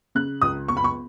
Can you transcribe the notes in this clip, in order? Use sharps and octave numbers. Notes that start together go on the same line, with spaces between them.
C#3 F#6
C#2 D#6
B3 C#6
B5
C#6